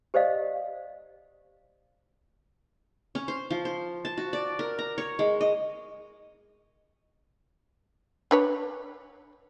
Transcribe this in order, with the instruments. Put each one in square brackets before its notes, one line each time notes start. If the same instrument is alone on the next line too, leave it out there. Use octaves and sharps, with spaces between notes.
[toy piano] G4 C5 D5 D#5 F5
[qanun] C#4
C5
F3
C5
A5
F#4
D5
A#4
A#5
C#5
G#3
D#5
[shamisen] D4 B4 C#5